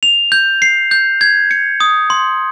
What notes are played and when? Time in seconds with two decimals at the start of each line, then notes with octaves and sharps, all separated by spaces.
0.03 F7
0.32 G6
0.62 C7
0.91 G6
1.21 G#6
1.51 C#7
1.80 D#6
2.10 C6